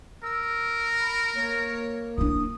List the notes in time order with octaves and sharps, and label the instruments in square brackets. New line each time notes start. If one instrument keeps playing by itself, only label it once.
[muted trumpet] A#4 [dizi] E6
[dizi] B5
[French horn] A#3 [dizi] C#5
[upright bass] D4 E4 [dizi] D#6